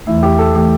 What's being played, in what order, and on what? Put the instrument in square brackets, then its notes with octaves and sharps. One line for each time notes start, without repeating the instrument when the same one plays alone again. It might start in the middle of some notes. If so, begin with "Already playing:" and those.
[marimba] E2 E3 A3 [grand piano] E4
[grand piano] G4
A4
[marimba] E3 A3 [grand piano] G4